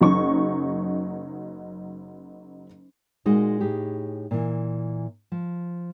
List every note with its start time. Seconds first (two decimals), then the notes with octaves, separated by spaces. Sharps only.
0.01 F#1 F#3 D#4 C#6
3.26 A#2 G#3 D#4 F#4
3.60 A2 D#4 G4 G#4
4.31 A#2 E3
5.32 F3